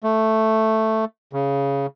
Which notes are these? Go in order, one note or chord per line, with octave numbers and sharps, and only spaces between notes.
A3
C#3